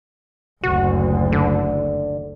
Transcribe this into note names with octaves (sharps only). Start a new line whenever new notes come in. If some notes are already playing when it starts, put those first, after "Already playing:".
F#1 D2 F#4
D3